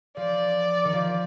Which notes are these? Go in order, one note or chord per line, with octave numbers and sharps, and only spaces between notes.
F3 D5
D#3
F3